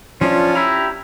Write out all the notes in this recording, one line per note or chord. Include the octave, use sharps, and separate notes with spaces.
F3 C#4 D4 F4
E4 G4 A#5